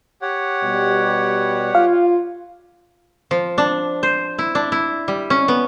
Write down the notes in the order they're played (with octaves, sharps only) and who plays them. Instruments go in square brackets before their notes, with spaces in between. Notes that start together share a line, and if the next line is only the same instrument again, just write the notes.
[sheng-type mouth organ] G4 C#5 F#5
[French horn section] B2 G3
[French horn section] F4 [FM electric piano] F5
[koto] F3
D4
C5
E4
D4
E4
G3
C#4
B3